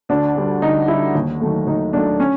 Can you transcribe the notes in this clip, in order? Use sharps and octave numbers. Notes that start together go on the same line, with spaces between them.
D2 D4
D3 G3
D2 D#4
D3 G3 E4
D#2
D#3 F#3 A3
D#2 D#4
D#3 F#3 A3 D4
C#4